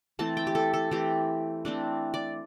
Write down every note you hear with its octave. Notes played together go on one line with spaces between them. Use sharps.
E3 A3 C4 A5
G5
G4
A4
A4
E3 A3 C4 G4
E3 A3 C4 D4
D5